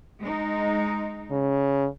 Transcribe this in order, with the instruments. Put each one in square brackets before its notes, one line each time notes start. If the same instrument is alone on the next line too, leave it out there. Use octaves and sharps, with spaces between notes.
[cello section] G#3 D#4
[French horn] C#3